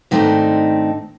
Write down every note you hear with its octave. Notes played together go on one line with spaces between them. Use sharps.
G#2 D#3 A3 C4 D4 D#4